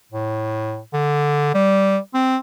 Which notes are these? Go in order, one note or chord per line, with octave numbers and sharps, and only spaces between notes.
A2
D3
G3
C4